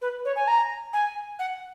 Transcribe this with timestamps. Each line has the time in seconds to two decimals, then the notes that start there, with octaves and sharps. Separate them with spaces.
0.02 B4
0.25 C#5
0.36 G#5
0.48 A#5
0.93 G#5
1.39 F#5